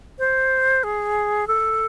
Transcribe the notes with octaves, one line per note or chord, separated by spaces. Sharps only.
C5
G#4
A4